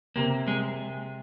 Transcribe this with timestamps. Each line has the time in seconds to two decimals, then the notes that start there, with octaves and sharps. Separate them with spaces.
0.16 C3 A#3
0.48 G#3